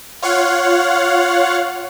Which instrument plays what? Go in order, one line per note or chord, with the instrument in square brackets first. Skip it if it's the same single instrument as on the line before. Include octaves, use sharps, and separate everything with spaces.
[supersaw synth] F4 C#5 F5 F#5